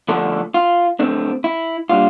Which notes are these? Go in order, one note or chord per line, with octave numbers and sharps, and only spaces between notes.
D3 F3 A3 D4 A4
F4
D3 A3 C4 D4
E4
A#2 G3 D4 F4